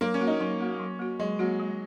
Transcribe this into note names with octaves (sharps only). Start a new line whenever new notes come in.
F#3 A#3
C#4
A#3 F#4
D#4
F#3 C#4
A#3 F#4
F#3
A#3 F#4
F#3 G#3
F#3 A#3 F#4
G#3